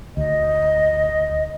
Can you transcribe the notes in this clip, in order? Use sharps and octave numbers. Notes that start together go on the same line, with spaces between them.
D2 D#5